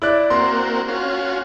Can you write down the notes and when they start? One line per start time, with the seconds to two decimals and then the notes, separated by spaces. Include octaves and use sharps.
0.02 E4 D5 F#6
0.30 A#3 C4 F#4 C6
0.88 C#4 F4 F#4